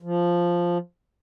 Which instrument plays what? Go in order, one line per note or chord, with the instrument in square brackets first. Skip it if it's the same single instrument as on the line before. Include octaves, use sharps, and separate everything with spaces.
[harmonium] F3